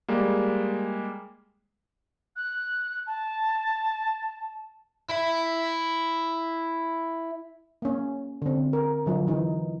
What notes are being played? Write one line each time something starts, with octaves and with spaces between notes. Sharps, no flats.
G3 G#3 A#3
F#6
A5
E4 E5
A#3 C#4
D3 C4
A#4
D3 F#3 F4
E3 D#4